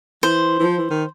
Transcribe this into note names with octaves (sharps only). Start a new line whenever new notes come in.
E3 C5
E3
F3
E3
D#3